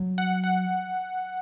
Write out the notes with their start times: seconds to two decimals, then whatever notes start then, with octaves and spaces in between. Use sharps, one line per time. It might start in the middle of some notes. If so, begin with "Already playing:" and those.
Already playing: F#3
0.18 F#5
0.44 F#5